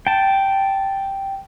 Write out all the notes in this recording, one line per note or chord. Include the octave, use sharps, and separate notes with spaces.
G5 A5